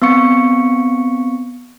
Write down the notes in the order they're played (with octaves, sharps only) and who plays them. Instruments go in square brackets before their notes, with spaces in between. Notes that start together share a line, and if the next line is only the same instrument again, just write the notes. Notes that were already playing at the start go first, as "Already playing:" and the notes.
[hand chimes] B3 C4 F5 C#6 C#7